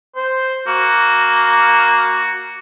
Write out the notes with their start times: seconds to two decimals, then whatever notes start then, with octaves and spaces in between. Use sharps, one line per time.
0.16 C5
0.67 A#3 F#4